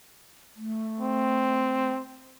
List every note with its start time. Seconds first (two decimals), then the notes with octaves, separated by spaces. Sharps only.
0.56 A3
1.00 C4